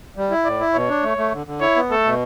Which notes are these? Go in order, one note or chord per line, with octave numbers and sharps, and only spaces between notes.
G3
E4
A2 D5
E4
B2 C#5
D4
A3
A3
D3
D3
E4 C#5
B3
A3 A4
B2